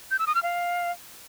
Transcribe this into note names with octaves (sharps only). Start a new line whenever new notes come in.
G6
E6
D#6
F6
F5